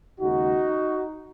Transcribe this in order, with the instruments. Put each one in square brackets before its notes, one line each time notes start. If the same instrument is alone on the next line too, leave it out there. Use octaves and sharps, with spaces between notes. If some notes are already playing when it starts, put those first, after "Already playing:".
[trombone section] D#2 C#3 G#3 D#4 F#4